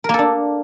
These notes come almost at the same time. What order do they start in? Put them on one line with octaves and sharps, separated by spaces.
A#4 A#3 A4 D4